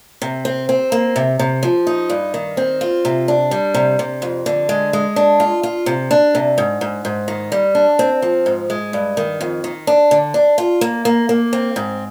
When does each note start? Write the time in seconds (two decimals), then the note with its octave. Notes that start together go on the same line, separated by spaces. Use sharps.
0.22 C3
0.45 C4
0.69 C4
0.92 A#3
1.16 C3
1.39 C3
1.63 F3
1.87 D#4
2.10 G2
2.34 D#3
2.57 C4
2.81 F4
3.05 C3
3.28 D4
3.51 G3
3.74 C3
3.99 C3
4.22 F2
4.46 D3
4.69 G#3
4.93 G#3
5.16 D4
5.40 F4
5.63 F4
5.86 C3
6.11 D4
6.35 C3
6.58 G#2
6.81 G#2
7.05 G#2
7.28 D#3
7.52 G3
7.75 D4
7.99 C4
8.22 F3
8.46 G#2
8.70 G#3
8.93 G2
9.17 D#3
9.41 F2
9.64 D#3
9.87 D4
10.11 D3
10.34 D4
10.58 F4
10.81 A#3
11.05 A#3
11.29 A#3
11.53 C4
11.76 G#2